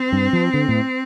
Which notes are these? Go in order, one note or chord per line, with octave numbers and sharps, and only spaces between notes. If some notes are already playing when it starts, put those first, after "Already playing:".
Already playing: C4
G2
F3
D3
A2